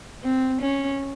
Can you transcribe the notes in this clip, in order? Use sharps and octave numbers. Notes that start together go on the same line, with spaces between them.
C4
C#4